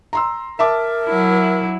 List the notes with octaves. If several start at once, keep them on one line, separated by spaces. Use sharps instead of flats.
A#5 C6 E6
A#4 E5 A5 D6
F#3 E4